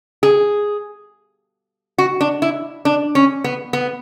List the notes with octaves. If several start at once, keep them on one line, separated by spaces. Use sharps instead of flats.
G#4
F#4
D4
E4
D4
C#4
B3
B3